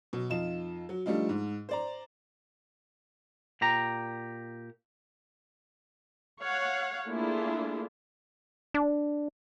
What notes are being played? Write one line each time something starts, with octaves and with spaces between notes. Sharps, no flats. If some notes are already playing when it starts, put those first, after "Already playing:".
B2 F#3
F2 D#4 F4 E7
F#3
F3 G3 A3 D4 D#4 F4
G#2
C5 D5 A#5
A#2 G4 A#5
C#5 F5 F#5
A3 A#3 D4 E4 F4 G#4
D4